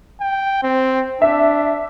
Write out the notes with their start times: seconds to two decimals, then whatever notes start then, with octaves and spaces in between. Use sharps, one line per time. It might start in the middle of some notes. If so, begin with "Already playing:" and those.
0.21 G5
0.63 C4
1.22 D4 E5